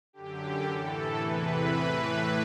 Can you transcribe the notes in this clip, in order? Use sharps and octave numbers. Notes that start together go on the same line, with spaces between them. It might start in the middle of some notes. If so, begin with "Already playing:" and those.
F#2 D3 G4
A2 E3 A4
E2 C3 E3 B4
A2 E3